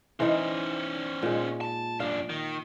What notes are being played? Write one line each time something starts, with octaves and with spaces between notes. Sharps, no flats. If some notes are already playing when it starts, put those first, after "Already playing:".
E3 C#4 D#4 C5
A#2 G#3
A5
F#2 D4 F5
D#3